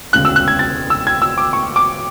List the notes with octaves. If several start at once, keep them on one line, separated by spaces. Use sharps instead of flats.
E1 D2 C#3 G#3 F#6
E6
F#6
G#6
A6
E6
G#6
E6
D6
C#6
D6